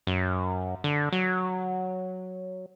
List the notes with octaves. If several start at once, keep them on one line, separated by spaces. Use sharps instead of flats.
F#2
D3
F#3